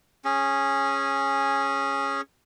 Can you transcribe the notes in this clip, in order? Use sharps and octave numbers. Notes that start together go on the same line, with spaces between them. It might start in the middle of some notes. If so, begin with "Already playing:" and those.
C#4 G#4